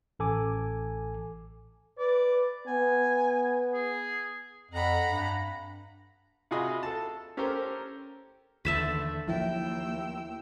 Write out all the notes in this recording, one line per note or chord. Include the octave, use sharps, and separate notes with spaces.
A1 A4 G#5 D6
B4 D5
B3 G#5
G#4
F2 F#5 A#5 B5
G2
C3 F4 F#4 G#4 D#5 B5
A4 A5
C#4 G4 A4 A#4 C5
D#2 D3 E3 A3 E5 A5 B5
D#2 F3 F#3 E4 G5 E6